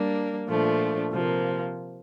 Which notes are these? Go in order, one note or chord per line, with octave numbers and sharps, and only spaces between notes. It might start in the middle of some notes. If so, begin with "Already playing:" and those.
Already playing: G3 A#3 D4
A#2 F3 A3 D4
C3 F3 A#3